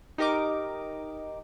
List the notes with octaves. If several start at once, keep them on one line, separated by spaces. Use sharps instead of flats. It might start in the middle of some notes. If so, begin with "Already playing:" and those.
D#4 G4 A#4 D#5 D6